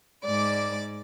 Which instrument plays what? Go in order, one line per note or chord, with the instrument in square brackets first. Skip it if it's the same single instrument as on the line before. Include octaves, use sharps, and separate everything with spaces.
[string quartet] G#2 D5 D6